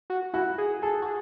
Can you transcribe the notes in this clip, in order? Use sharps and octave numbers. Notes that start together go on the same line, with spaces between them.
F#4
E4 F#4
G#4
G#4 A4
F#4
G#4